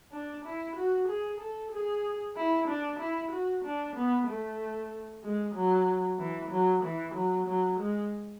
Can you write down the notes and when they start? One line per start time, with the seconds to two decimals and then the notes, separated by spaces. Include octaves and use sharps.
0.12 D4
0.45 E4
0.76 F#4
1.08 G#4
1.40 A4
1.72 G#4
2.37 E4
2.68 D4
2.99 E4
3.31 F#4
3.64 D4
3.96 B3
4.27 A3
5.24 G#3
5.55 F#3
6.19 E3
6.51 F#3
6.84 E3
7.15 F#3
7.47 F#3
7.80 G#3